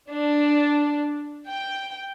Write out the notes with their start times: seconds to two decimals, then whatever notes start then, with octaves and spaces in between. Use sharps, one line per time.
0.11 D4
1.49 G5